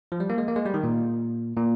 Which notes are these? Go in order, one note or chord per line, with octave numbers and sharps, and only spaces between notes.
F3
G3
A#3
G#3
A#3
G#3
G3
D#3
A#2
A#2